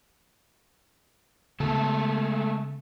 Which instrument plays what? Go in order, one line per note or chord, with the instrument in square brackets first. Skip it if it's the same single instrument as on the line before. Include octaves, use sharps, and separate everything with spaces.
[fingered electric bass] C#3 B3 [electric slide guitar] G#3 A3 A4